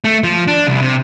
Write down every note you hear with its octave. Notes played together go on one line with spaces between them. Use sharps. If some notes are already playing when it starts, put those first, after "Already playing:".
A3
F3
D4
C2
C3